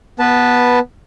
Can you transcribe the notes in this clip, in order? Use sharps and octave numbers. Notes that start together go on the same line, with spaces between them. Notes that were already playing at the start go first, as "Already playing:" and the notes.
B3 B4 A5